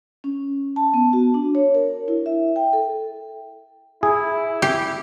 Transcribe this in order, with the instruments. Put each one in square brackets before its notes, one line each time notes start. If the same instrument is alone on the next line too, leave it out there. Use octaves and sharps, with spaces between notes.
[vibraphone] C#4
A5
B3
F#4
D4
C#5
A#4
E4
E5
G5
A4
[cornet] E4 [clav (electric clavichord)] G#4
[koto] G4